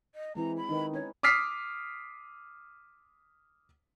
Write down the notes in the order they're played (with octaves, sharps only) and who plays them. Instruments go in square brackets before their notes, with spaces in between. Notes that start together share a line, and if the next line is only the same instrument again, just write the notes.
[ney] D#5
[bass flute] E3 [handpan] G#3 C4 E4 [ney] A#5
[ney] B5
[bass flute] D#3 [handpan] D#4 B4
[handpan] C#4 [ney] C#5
[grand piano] D6 D#6 F6 B6 C7